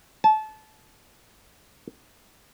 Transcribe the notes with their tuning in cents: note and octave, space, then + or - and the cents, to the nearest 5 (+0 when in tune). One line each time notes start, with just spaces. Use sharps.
A5 -25